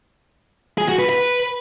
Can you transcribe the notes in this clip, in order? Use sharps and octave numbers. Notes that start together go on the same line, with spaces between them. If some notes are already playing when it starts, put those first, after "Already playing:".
G#4
F#4
B4
B4